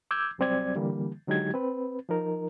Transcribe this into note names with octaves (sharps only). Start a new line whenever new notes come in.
D6 E6 G6 G#6
C2 F#3 G3 C4 D5 G#6
D3 E3 G3 A#3
D3 F#3 G#3 D#4 G4 G#6
C4 B4
F3 D#4 A#4